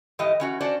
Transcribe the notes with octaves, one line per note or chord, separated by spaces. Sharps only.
G#2 E3 G4 D#5
E3 C#4 F#4
C#4 D4 F#4 C5 D5